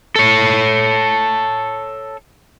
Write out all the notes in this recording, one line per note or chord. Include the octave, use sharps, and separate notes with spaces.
A4 C#5